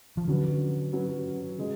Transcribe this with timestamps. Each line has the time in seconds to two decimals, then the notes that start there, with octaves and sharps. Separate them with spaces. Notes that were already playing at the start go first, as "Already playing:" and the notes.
0.17 F3
0.28 D3 F#3 C#4 F#4 B4
0.93 F#3 C#4 F#4 B4
1.58 C#3 G#3 C#4